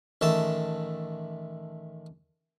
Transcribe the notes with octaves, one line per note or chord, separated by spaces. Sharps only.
A1 D#3 A3 A5